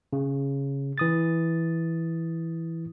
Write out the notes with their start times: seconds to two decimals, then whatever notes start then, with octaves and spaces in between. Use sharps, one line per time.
0.13 C#3
0.98 E3 D#6 A6